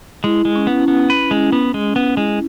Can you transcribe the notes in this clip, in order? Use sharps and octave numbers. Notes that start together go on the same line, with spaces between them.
G#3 E4
G#3
C#4
B3
B3
B4
G#3
B3
G#3
B3
G#3 E4